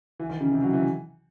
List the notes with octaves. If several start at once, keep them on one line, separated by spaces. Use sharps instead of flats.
E3
D#3
C#3
C3
F#3
E3